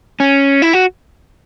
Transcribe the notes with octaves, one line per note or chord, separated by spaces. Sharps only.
C#4
E4
F#4